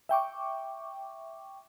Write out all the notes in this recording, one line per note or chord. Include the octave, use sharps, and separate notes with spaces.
E5 G5 C#6 D6